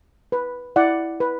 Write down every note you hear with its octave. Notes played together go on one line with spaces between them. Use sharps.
B4
E4 D5 F#5
B4